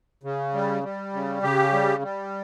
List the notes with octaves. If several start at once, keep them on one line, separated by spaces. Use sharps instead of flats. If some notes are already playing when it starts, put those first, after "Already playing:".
C#3
G3
G3
C#3
C#3 G4
G3
G3